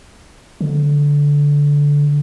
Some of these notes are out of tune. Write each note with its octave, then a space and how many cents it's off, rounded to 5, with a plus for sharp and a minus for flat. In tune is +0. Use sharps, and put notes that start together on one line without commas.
D3 -15